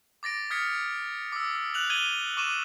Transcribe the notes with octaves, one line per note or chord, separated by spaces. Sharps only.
D6 A6 A#6 D7
D#6 F6 G#6 B6 C#7
D6 E6
F#6 F7 F#7
G#6 D#7 F#7 G7
C#6 D6 D#7 E7